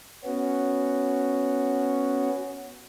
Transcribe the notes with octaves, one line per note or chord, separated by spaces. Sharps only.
B3 C#4 F#4